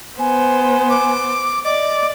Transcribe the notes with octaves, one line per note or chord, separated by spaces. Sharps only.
B3 C5 G#5
D6
D5 D#5 D6